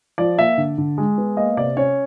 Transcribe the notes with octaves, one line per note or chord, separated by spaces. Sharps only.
F3 D5
A#3 E5
D3
D3
G#3
B3
A#3 D#5
C3 D5
C#4 C#5